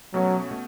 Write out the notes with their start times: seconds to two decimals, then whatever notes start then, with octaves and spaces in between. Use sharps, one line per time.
0.14 B2 F#3 A3 C#4 F#4
0.51 B2 A3